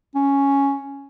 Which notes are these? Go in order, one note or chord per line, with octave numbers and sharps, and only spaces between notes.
C#4